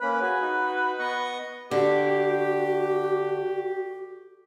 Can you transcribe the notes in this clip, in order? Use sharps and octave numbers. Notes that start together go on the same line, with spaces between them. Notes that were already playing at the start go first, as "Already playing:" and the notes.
A#3 C#4 B4 B5
F#4 G#4
D#4 F#4
B3 D#5 C#6
D3 F#4 G4